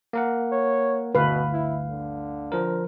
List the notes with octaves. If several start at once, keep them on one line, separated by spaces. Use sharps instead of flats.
A#3 A#4 F#5
C#5
G1 D2 B2 B4 F5
E4
D3
F3 A#4